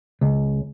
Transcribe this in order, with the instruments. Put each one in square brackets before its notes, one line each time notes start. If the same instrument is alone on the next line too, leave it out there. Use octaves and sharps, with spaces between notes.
[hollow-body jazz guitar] C#2